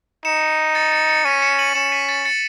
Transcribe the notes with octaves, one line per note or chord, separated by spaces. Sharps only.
D#4 C#7 E7
A6 C#7
A6 C#7
A6 C#7
C#4 B6 D#7
C#7 E7
D#7 F#7
C#4 C#7 E7
B6 D#7
A6 C#7
A6 C#7